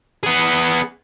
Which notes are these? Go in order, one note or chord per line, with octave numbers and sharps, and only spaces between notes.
B3 G#4